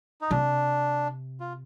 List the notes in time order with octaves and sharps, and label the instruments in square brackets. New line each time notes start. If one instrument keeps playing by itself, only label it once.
[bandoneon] D#4
[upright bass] C3 [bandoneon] D4
[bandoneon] F4